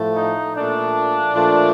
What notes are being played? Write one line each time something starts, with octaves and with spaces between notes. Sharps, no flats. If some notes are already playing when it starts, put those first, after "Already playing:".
Already playing: A2 F3 A3
D#4
A#2 F3 A3 D4
A#2 F3 A3